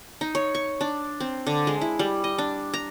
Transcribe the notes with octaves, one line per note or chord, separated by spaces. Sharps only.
D#4
C#5
C#6
D4
C4
D3
G#3
E4
G3
D#5
D4
A#5